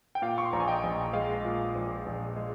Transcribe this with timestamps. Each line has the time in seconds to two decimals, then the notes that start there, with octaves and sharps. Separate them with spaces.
0.15 G5
0.22 A#2 F5
0.38 C#6
0.45 C6
0.53 A#1 A#5
0.60 G#5
0.68 D#5 G5
0.83 A#1
1.13 G#3 F5
1.45 A#2
1.75 A#1
2.06 A#1
2.36 G#3